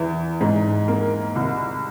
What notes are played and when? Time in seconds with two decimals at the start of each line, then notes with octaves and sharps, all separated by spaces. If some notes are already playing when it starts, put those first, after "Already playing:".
Already playing: E2 E3
0.41 G#2
0.88 A#3
1.36 C2